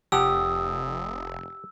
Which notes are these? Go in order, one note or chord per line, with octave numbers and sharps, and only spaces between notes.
F1 G4 F#5 A5 D#6 E6